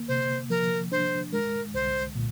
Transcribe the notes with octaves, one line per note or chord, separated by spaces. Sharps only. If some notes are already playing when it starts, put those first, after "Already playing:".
Already playing: A#3
C3 C5
F3 A#4
D4 C5
G#3 A#4
C2 C5
A#2